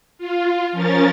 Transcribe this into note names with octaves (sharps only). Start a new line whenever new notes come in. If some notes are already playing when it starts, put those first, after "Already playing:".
F4
F3 C#4 A#4 A6